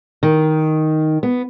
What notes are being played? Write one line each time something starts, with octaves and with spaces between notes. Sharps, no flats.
D#3
B3